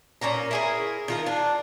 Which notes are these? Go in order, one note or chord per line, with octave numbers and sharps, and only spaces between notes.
A#2 C#4 A#4 A#5
E4 G#4 A#4
D#3 F4 A#4
D4